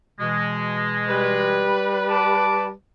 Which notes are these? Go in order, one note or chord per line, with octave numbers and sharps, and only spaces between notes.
B2 E3 G#3
G3 B4
A5 D6